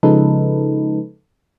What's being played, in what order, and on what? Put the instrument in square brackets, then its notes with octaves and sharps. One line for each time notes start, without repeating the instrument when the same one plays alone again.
[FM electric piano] C#3 F3 G#3 D#4 A4 B4